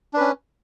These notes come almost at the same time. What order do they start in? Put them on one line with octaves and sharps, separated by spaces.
D4 B4 C#4